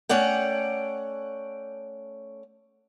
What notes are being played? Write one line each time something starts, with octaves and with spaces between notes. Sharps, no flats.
A3 C#4 D5 F#5 G5